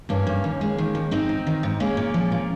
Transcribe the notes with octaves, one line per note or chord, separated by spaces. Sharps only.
G2 A#3 C#4
G2
D#2
G#3
D#3
D#2
G#2 C4 D#4
G#2
D#3
G#2
G#3 A#3 C#4
A#2
F3
A#2